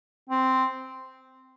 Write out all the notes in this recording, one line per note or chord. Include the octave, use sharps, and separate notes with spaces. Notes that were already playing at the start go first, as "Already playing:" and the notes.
C4